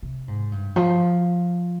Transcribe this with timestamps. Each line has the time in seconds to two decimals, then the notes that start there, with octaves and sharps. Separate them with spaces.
0.03 C3
0.28 G#2
0.52 G2
0.76 F3